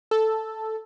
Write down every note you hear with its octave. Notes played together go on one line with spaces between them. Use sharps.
A4